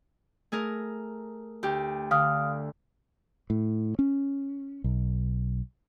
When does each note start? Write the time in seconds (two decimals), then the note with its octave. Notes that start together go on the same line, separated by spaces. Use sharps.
0.52 A3 G#4 A#4
1.63 D2 G4
2.11 D3 F5 D#6 F6
3.50 A2
3.99 C#4
4.84 B1